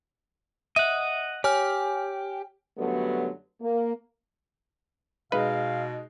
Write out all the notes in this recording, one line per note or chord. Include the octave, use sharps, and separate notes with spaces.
D#5 E5 F#5
G4 C#5 G#5 F6
F#2 D3 F#3 G3 A3 B3
A#3
B2 G#3 D#4 B4 F5